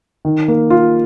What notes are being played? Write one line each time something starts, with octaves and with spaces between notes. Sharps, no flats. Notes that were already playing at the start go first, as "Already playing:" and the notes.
D#3
A#3
F4